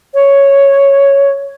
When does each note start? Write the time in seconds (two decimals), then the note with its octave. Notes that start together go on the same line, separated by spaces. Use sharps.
0.14 C#5